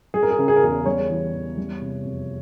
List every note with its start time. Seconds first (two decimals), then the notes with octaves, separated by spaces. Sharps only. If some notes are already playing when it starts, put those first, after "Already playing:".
0.14 G3 G#4
0.23 A#4
0.31 G#4
0.39 C#3 A#4
0.48 G#4
0.56 A#4
0.62 E2 G#4
0.86 G3 C#5
1.10 E3
1.34 E2
1.57 G3
1.81 C3
2.05 F2